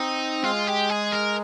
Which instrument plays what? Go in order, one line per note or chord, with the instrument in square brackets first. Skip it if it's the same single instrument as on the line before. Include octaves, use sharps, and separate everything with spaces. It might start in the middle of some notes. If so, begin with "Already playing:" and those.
Already playing: [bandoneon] C4 [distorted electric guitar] D#4
[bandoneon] G#3 [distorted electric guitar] F4
[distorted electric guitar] G4
G#4
A#4